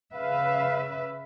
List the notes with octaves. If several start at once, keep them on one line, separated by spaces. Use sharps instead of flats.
C#3 B4 E5 F5